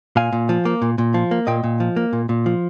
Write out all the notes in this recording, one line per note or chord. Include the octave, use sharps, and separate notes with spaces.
A#2 F5 G#5
A#2
F3
A#3
A#2
A#2
F3
A#3
A#2 D#5 G5
A#2
F3
A#3
A#2
A#2
F3